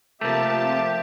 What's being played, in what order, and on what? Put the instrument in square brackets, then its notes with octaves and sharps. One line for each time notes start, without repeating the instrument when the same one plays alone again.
[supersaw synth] C3 F3 A5 [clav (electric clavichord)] A3 A#3 [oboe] G4 [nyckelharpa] E5